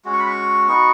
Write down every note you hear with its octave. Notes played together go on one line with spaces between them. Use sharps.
G#3 C#4 F#4
C#6
B5
C#6
B3 D#4 F#4